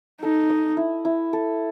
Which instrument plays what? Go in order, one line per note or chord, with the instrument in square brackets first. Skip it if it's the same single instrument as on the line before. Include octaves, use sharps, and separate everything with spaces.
[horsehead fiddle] D#4 [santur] A4
[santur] D#5
E4
E4
A4